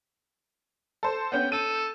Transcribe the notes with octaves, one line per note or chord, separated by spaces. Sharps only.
A4 C5
B3 C#4 G5 G6
A4 D#7